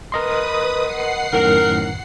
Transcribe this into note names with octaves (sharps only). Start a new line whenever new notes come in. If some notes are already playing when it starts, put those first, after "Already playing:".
A#4 B4 D#5 C6 D#6
F#5 C7
F#2 A2 D#3 A#4